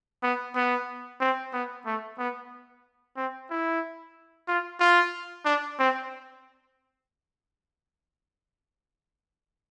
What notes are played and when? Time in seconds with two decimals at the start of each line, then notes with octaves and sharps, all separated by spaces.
0.23 B3
0.56 B3
1.21 C4
1.53 B3
1.86 A3
2.18 B3
3.17 C4
3.50 E4
4.48 F4
4.80 F4
5.45 D4
5.79 C4